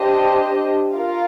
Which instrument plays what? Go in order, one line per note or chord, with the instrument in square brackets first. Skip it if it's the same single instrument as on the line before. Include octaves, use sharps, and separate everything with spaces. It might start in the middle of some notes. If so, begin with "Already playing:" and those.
Already playing: [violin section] D4 G4 C5 D#5
F4 A#4 F5